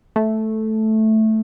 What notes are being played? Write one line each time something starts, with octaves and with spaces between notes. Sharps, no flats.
A3